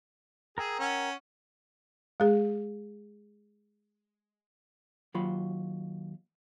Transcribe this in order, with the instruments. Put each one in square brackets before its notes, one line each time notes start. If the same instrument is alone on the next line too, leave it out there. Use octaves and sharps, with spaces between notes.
[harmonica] G#4 [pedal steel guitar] A#4 G5 E6
[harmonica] C#4 F#5
[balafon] G#3 G#4
[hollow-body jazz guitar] D#2 F#3 F4 B5